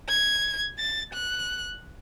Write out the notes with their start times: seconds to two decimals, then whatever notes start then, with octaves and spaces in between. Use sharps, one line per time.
0.09 G#6
0.78 A6
1.14 F#6